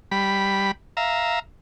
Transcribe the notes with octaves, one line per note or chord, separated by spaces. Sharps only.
G3 B5
E5 F5 A#5